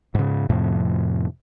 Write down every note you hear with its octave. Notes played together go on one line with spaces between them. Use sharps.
G#2 C#3
F2 A2 C3 F3